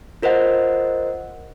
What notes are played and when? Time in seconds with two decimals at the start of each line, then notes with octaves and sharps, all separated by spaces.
0.22 F4 A#4 C5 D#5 F#5